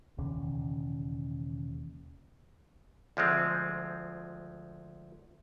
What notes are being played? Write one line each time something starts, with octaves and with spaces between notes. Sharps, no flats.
E1 D#2 C#3
D2 F3 G#3 C4